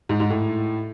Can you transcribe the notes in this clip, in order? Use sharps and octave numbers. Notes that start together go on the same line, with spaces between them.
G#2
G#2
A2